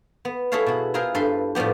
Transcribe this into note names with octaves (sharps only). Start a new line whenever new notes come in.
B3
E4 G#4 A4 C#5 E5 F5
B2 F#4
E4 F4 G#4 A#4 C5
G2 A4 B4 C6
A2 F3 G3 B3 G4